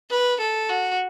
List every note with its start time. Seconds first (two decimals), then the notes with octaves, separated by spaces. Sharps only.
0.10 B4
0.40 A4
0.69 F#4